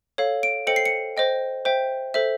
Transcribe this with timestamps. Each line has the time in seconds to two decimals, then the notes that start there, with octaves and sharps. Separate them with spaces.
0.18 A4 C#5 F5
0.43 D7
0.67 A4 C5 D#5 G5 C#7
0.76 C7
0.86 C#7
1.17 C5 D#5 G5
1.65 C5 E5 G5
2.14 A4 C5 E5